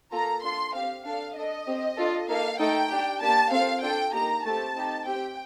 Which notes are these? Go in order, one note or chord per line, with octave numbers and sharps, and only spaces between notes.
A#3 F4 A4 A#5
D4 F4 A4 C6
C4 G4 F5
D4 A4 F5
D4 A4 D#5
C4 G4
D4 F4 A4
A#3 D#4 A4 F5
A3 D#4 A4 G5
D4 G4
A#3 D4 G4 A5
C4 F4 A4 F5
D4 F4 A4 G5
A#3 D#4 G4 A#5
A3 C4 G4 A5
C4 D#4 G4
C4 G4 G5